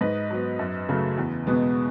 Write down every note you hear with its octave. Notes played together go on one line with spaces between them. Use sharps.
G#2 B4 D#5
F#3 B3
F#2
C#3 F#3 A3
E2
B2 G#3 B3